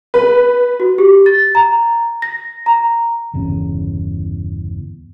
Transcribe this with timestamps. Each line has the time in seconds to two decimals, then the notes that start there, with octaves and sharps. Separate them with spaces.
0.14 B4
0.80 F#4
0.98 G4
1.26 A6
1.55 A#5
2.22 A#6
2.66 A#5
3.34 G1 E2 C#3